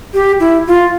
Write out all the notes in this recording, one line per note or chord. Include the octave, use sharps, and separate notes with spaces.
G4
E4
F4